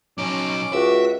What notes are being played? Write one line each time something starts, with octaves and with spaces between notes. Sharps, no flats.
F#3 C#4 D#4 D6
C#2 F#4 E5